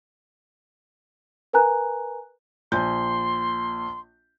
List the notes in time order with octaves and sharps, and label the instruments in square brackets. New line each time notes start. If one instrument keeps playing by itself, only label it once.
[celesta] A#4 B4 G#5 A#5 F#6
[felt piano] A#1 G#5 G6 [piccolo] C6